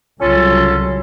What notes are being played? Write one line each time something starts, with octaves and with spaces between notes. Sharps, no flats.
C2 C#3 F#3 C#4 F4 A4